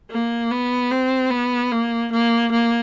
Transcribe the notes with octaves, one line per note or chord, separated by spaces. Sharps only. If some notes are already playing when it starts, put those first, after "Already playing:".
A#3
B3
C4
B3
A#3
A#3
A#3